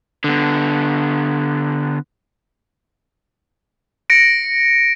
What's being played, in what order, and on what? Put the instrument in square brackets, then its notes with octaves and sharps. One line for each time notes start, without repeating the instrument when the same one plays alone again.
[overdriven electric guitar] D3 B3
[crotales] A#6 C#7 D7